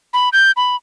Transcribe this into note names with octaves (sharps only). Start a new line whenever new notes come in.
B5
G6
B5